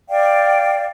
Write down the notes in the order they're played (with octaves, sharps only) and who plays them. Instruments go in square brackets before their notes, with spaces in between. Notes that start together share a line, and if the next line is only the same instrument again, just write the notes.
[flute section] D5 F5 G5